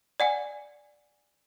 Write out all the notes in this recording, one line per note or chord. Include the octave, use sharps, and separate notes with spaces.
D5 F#5 G#5